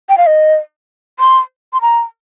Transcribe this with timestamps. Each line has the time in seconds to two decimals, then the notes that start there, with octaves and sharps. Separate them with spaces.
0.09 G5
0.17 F5
0.26 D#5
1.19 C6
1.73 C6
1.81 A#5